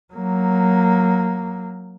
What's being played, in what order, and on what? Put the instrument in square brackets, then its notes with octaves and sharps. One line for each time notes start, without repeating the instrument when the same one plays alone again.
[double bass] F#3 A#3